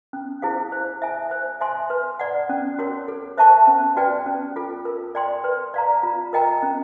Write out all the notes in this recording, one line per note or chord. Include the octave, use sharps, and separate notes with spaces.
C#4
E4 G#4 C5 F5
C5
E5 G#5
C5
E5 G#5 C6
B4
D5 F#5
C#4
F#4 A#4 C#5
A4
C5 E5 A5 C#6
C#4
F#4 B4 D5 G5
C#4
F4 A4
A#4
D5 G5 C6
B4
D5 F5 A#5
F4
A#4 D#5 G5 A#5
C#4